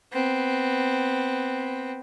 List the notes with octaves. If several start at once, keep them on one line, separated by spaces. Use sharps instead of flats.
B3 C4